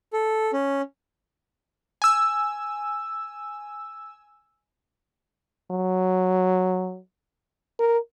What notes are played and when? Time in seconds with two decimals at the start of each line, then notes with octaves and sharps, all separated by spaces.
0.13 A4
0.53 C#4
2.02 G#5 E6
5.72 F#3
7.80 A#4